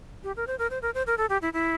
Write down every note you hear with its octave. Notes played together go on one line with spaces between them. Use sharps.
G4
A#4
C5
A#4
C5
A#4
C5
A#4
A4
G4
E4
E4